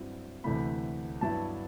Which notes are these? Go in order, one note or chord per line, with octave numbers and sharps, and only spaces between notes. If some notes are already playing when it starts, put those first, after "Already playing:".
Already playing: G2 F#3 C4 E4
D2 C3 E3 A3 B5
G2 F#3 B3 E4 A5